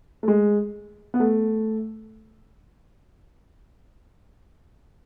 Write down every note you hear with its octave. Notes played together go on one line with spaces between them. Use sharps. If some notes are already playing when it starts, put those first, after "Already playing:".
A3
G#3
B3
A3